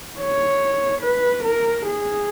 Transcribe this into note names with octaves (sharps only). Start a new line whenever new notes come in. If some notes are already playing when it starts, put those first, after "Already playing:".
C#5
B4
A#4
G#4